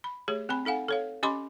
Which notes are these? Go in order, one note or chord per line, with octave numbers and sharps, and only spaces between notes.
B5
A3 G4 G#4 C#5
C4 G#5 B5
D#4 A4 F5 F#5 G#5
A4 C#5 F5
C#4 G4 D#5 B5 C6 D6